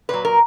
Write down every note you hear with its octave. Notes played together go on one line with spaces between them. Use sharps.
A#2 F#3 B4
A#4